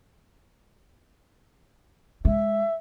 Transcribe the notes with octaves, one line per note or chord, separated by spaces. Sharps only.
G#3 E5